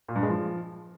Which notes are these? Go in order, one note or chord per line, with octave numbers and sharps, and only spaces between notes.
A#2
G2
G#3
F3